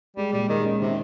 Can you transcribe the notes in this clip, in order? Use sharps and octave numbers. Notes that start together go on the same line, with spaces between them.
G3 G#3
A#2 G3
D#3 G#3
C#4
C3 D#3